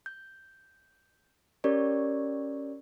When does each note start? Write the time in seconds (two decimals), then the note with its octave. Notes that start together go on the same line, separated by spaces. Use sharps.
0.06 G6
1.64 C#4 G4 A#4 C#5 D5